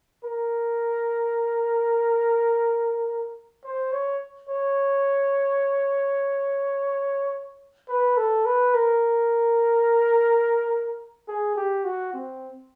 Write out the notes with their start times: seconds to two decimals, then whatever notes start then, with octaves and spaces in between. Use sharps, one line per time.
0.24 A#4
3.64 C5
3.92 C#5
4.49 C#5
7.89 B4
8.17 A4
8.46 B4
8.74 A#4
11.28 G#4
11.56 G4
11.84 F#4
12.13 C4